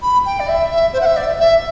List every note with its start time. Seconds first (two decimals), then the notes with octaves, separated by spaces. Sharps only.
0.02 B5
0.25 G5
0.39 D5
0.48 E5
0.70 E5
0.93 C5
1.01 F#5
1.05 E5
1.16 D5
1.40 E5